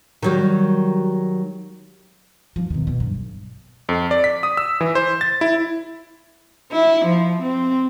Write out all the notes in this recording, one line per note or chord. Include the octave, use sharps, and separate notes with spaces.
D#3 F#3 G3
F3
B2 D#3
B2
G2
B1
F2
D5
B6
D#6
E6
E3
C5
A6
E4
E4
F3
C4